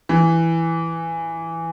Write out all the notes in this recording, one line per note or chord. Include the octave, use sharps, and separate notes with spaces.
E3